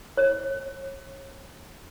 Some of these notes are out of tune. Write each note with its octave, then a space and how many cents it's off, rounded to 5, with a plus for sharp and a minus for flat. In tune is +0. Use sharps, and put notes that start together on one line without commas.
C#5 -35